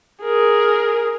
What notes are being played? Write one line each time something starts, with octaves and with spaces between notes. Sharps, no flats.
G#4 A#4